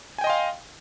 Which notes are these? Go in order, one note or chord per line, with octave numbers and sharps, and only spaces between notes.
D#5 F5 G5 G#5 C6